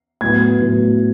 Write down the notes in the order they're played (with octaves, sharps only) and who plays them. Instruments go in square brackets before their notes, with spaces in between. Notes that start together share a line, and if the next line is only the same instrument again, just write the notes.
[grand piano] A2 F#3 B3 G#6
A2 F#3 B3